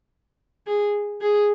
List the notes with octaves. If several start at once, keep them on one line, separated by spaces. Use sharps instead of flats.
G#4
G#4